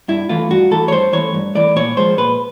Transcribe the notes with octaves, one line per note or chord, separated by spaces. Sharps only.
G2 E4
E3 A3 F4
G2 F#4
E3 A3 A4
C#5
G2 C5
E3 A3 C#5
G2
E3 A3 D5
A#2 C#5
F3 G#3 C5
A#2 B4